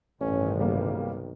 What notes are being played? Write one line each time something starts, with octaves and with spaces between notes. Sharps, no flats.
A1 G2 C3 D#3 C#4
B1 C#3 G3 A#3